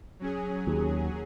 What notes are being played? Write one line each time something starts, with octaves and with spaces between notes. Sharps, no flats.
F#3 C#4 G#4
D#2